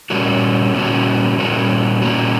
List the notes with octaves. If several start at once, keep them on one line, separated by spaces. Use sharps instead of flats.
A#2 G3 A#3 C#4 F#4
A#2 G3 A#3 C#4 F#4
A#2 G3 A#3 C#4 F#4
A#2 G3 A#3 C#4 F#4